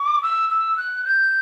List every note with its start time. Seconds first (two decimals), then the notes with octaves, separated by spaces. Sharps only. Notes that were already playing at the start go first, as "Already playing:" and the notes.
Already playing: D6
0.23 E6
0.50 E6
0.77 F#6
1.05 G6